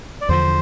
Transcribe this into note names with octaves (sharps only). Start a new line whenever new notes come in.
D5
E2 D3 F3 C5